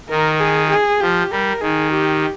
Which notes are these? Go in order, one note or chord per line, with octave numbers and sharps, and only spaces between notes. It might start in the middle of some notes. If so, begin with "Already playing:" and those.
D#3 A#4
G#4
G#4
F3 G4
G3 A#4
D#3 G#4
G4